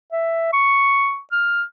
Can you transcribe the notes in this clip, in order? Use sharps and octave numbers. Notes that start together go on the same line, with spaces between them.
E5
C#6
F6